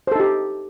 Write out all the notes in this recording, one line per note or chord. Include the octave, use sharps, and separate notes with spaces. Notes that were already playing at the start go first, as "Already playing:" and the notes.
D#4 G4 A4 C5